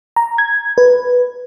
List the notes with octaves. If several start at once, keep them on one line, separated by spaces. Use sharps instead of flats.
A#5
G#6
B4